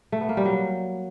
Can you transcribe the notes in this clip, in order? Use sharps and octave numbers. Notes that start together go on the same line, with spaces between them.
A3
B3
A#3
G3
F#3